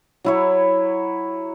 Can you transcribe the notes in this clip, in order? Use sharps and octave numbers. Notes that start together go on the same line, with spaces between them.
F#3 E4 C#5